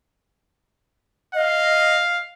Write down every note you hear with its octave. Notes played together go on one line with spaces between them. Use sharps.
D#5 F5